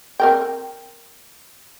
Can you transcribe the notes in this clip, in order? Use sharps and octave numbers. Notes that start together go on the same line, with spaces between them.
C4 A#4 G5